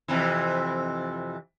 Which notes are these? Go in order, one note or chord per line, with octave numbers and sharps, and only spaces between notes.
F2 C3 E3